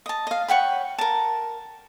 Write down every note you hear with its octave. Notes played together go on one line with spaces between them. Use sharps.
D#5 A5
D#5 F5
C#5 F#5 G5 B5
A#4 A5